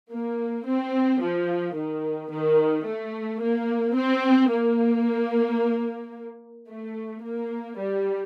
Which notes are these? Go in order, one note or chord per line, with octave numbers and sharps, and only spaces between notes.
A#3
C4
F3
D#3
D#3
A3
A#3
C4
A#3
A3
A#3
G3